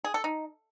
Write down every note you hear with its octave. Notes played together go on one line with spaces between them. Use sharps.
G#4
A4
D#4